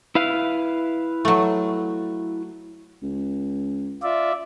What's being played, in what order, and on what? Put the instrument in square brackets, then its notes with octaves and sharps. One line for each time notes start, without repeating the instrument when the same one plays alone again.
[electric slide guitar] E4 B4 F5
[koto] F#3 A3
[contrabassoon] C#2
[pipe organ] F4 D5 E5